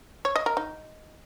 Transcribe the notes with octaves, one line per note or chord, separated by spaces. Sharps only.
C#5
D#5
A#4
D#4